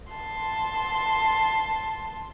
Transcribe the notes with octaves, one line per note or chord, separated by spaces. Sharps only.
A5 C6